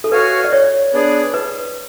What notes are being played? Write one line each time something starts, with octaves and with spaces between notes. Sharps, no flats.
A4
F#4 B4 C#5 F5 G#5
D5
C#5
B3 D4 G#4 D5
B4